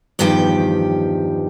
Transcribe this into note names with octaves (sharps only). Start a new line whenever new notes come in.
E2 G2 D#3 F3 G4 G5